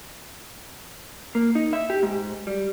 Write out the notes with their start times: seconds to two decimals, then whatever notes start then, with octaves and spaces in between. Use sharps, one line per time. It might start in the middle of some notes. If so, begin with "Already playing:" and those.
1.35 A#3
1.55 D#4
1.73 E5
1.90 G4
2.03 G#2
2.47 G3